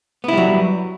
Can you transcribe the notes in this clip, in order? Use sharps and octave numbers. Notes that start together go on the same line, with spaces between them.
F#3 G3 B3 E4